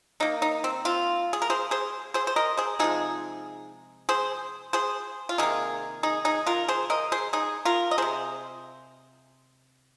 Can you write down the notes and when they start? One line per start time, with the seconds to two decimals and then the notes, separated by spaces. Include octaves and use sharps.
0.20 D#3 A#3 D#4
0.42 D#4
0.64 C4
0.85 C4 F4
1.33 G#4
1.42 A#4
1.50 G#4 C5
1.71 G#4 C5
2.14 G#4 C5
2.27 C5
2.36 A#4 D#5
2.57 G#4 C5
2.79 C3 F3 G#3 D#4 G#4
4.09 G#4 C5
4.73 G#4 C5
5.29 F4
5.38 C3 D#3 A#3 D#4 G#4
6.03 D#4 G#4
6.25 D#4 G#4
6.46 F4 A#4
6.68 G#4 C5
6.90 A#4 D#5
7.12 G#4 C5
7.33 D#4 G#4
7.65 F4 A#4
7.91 D#5
7.98 C3 G#3 G#4 C5